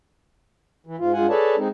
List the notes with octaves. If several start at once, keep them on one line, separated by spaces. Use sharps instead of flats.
E3
G#2 F4
G2 G#3 F4 F#5 G#5
G#4 A4 B4 C#5 D5 A5
G#3 C4 D#4